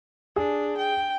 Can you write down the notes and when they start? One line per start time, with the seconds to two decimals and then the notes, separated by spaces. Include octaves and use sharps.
0.36 D4 G#4
0.77 G5